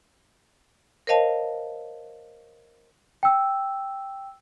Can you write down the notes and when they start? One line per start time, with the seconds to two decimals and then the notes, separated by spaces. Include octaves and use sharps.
1.07 A#4 C5 C#5 D#5 F5 A5
3.23 G5 E6